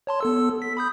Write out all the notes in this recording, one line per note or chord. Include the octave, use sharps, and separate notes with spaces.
C#5 A5 C6
B3 A4 E6
B6
B5 D#6 G6